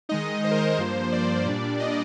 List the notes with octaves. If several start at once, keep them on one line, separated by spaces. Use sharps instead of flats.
D#3 G#3 D#4 D#5
C5
A#4
C5
G2 F3 A#3
D5
A#2 G3 D4
D#5